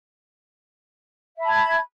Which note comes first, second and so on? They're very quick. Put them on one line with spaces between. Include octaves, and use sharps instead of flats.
E5 B5 A5 G#6